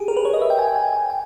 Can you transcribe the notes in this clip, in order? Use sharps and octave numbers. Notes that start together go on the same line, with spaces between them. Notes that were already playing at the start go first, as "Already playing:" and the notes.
Already playing: G4 G#4
A#4
B4
C#5
D#5
E5
G5
G#5
G5
G#5
G#5
G5